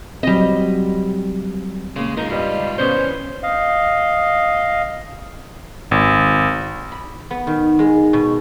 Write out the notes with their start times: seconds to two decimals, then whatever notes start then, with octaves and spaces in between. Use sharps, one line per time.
0.23 F#3 G3 C4 D#5
1.96 C#3 G#3 A#3
2.17 G#2 D#4 F4 A#4
2.30 G2 G3 D#5
2.78 G2 C#3 B3 C#4 C5
2.95 E3
3.43 D#5 F5
5.91 G#1
6.92 B5
7.31 B3
7.47 D#3
7.79 G#3
8.13 B2